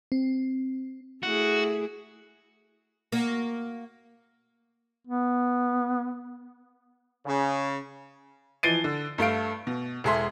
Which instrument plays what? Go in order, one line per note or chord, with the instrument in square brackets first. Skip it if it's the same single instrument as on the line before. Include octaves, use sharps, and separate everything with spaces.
[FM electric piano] C4
[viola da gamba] A3 E4 G#4 [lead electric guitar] F#4
[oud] A#3 F#4
[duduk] B3
[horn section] C#3
[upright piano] E3 F3 A6 C7 D7 D#7
D3
G2 A3 F5 D7
B2
E1 G#3 G#4 A4 E5 C6